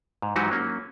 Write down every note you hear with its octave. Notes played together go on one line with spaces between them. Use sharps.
G#2
G#2 E3 F#3 D#4 F#4 G4
F#3 A#3 C#4